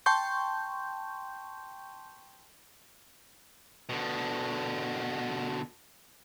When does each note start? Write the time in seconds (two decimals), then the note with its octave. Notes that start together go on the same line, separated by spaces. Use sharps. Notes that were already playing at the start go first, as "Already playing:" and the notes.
0.06 G5 A5 C6 C#6 G6
3.89 B2 D3